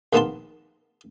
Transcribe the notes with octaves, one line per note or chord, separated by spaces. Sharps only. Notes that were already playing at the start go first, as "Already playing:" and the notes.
A#1 D#3 A#3 B3 A5 C6